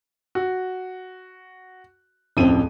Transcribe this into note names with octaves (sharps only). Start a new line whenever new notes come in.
F#4
D1 F2 C4 C#4 E4 D#7